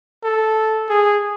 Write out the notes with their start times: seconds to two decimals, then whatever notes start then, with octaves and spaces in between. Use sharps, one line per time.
0.24 A4
0.89 G#4